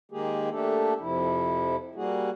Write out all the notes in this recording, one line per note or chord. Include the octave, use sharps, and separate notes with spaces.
D#3 G#3 A#3 G4 G#4
A3 A#3 D4 G4 A4
F2 C3 F3 E4
G3 A#3 F#4 G#4